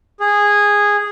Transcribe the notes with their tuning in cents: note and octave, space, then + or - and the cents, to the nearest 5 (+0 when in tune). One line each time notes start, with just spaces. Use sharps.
G#4 -10